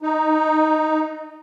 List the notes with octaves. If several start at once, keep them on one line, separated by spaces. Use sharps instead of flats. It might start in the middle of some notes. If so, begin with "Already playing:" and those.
D#4